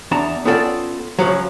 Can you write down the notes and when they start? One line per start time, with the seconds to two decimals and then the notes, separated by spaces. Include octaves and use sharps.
0.11 E2 D4 A5 A#5
0.45 B3 C#4 F4 A4 D5 G5
1.19 C#3 F3 F#3